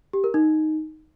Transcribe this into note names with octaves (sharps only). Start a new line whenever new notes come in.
G4
A#4
D#4